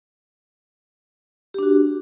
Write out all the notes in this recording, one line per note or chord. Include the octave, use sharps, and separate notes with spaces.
D4 F#4 G4